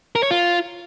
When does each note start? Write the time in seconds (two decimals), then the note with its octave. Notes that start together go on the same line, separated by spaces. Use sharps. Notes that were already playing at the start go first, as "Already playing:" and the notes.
0.15 A#4
0.23 C#5
0.31 F4